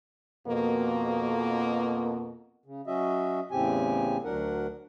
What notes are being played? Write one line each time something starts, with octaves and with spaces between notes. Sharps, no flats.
F2 B2 A#3
C#3
F#3 C#4 F#4 D#5 E5
E2 A2 C#3 C4 G4 G#5
D2 F#3 D4 A#4 F#5